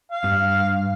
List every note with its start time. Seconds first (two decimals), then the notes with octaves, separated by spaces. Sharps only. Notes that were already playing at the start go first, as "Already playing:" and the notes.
0.11 F5
0.24 G2